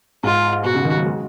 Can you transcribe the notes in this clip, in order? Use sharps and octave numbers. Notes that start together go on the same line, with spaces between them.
G#2 F4
B2 F#4
C#3
D#3
F#3
G#3